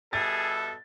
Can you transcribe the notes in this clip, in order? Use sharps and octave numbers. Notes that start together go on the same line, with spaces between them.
B2 G3 G#4 A4 E5 A6